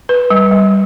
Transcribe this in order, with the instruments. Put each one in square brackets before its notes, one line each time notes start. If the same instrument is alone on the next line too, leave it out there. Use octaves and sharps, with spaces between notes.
[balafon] B4
G3
G3